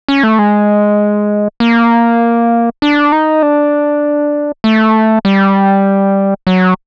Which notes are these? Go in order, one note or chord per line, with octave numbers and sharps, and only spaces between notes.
C#4
A3
G#3
A#3
D4
D#4
D4
A3
G3
F#3